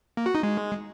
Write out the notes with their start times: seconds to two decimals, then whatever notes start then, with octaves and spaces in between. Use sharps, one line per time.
0.17 A#3
0.26 F#4
0.35 D#4
0.43 G#3